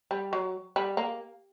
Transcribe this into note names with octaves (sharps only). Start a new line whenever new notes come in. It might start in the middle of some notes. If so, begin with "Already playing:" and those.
G3
F#3
G3
A#3